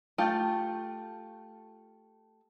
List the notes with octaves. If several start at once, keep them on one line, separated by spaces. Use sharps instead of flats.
A3 F4 G4